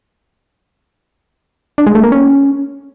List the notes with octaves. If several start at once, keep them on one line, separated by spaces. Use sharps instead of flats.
D4
G#3
A3
A#3
C#4